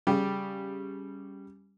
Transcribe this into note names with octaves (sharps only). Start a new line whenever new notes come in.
C#3 G3 G4